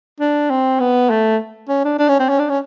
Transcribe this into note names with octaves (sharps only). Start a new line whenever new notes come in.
D4
C4
B3
A3
C#4
D4
D4
C#4
C4
C#4
D4
C#4